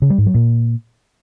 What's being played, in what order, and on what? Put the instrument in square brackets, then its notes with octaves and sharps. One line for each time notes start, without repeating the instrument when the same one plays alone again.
[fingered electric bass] C#3
G3
G#2
F#3
A#2